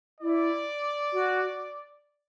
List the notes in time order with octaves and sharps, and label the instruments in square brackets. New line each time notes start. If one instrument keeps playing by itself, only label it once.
[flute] E4 [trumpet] D5
[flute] F#4